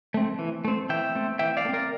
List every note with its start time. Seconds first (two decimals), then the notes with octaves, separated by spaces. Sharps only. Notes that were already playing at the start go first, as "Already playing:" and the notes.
0.14 A3 C4
0.39 E3
0.65 A3 C4
0.89 E3 E5 G5
1.15 A3 C4
1.39 E3 E5 G5
1.57 D5 F5
1.65 A3
1.69 C4 A#4 D5